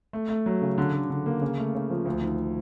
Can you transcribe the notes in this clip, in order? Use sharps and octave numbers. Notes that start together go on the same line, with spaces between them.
A3
A3
F#3
C#3
D3
D3
D3
A#3
C#3
A3
C#3
F3
D2
D#3